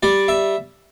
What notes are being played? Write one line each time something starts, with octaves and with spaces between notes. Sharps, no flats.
G3 D5
E5